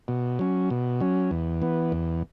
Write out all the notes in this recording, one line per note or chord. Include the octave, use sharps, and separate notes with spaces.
B2
F#3 C#4
B2
F#3 C#4
E2
E3 B3
E2